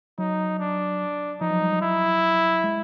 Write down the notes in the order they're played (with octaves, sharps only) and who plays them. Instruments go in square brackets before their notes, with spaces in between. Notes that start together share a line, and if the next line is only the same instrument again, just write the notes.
[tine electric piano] F#3 [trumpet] D#4
[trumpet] D4
[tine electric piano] F3 [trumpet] D#4
[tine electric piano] F#3
G3
F#3
[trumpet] E4
[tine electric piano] G#3